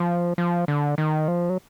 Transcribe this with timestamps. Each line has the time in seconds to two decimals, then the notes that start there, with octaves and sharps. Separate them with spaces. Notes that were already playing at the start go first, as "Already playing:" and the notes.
Already playing: F3
0.38 F3
0.68 D3
0.98 D#3
1.28 F3
1.49 F#3